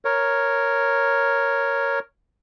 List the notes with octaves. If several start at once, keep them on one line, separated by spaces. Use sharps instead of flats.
A#4 C#5